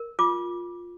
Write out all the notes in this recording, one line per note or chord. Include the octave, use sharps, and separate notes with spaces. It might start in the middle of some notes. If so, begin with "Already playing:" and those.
Already playing: A#4
F4 D6